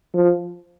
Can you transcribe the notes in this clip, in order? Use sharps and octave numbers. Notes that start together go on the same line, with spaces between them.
F3